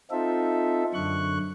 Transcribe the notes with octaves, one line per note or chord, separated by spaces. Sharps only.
C4 D#4 F4 A4 E5
F#2 D3 C#6 F#6